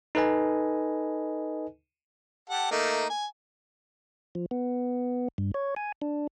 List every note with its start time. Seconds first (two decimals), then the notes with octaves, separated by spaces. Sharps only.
0.15 D#4 A4 B4 D#5 G#5
2.50 G4 A4 F#5
2.71 A3 A#3 D#4
3.10 G#5
4.35 F3
4.51 B3
5.38 G2
5.54 C#5
5.76 G#5
6.02 D4